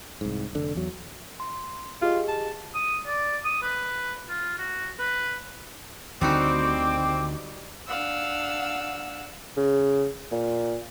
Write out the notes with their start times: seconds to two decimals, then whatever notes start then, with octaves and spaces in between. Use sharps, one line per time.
0.21 C2 G#2
0.53 F1 D3
0.75 E2 F#3
1.40 C6
2.02 F4 G4 G#4 D#5
2.28 A5
2.74 D#6
3.06 D5
3.44 D#6
3.62 B4
4.29 F4
4.58 F#4
4.99 B4
6.21 D2 D3 D#3 G3 C4 D#4 F#4 D6
7.86 D4 F5 F#5 E6
9.57 C#3
10.32 A#2